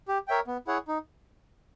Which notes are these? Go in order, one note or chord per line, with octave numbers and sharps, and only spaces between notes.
G4
A#4 C#5 E5 G5
B3
E4 G#4 C#5 F#5
D#4